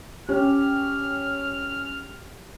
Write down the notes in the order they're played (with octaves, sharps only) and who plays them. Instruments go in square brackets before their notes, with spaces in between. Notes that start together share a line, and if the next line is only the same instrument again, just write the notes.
[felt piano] C#4 [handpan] G4 [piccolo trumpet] F6